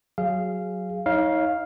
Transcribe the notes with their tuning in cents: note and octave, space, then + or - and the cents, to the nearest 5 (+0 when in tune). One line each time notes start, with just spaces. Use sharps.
F#3 +0 G#4 +0 F5 -15
D#4 +35 C#5 +0 F5 +0